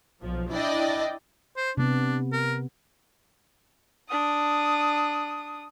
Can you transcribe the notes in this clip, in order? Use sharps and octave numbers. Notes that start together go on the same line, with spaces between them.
B1 F3
D4 E4 D5 D#5 G5
C5
C3 B3 D4
A#4
D4 D#6